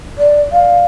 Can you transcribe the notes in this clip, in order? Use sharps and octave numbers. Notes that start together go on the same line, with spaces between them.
D5
F5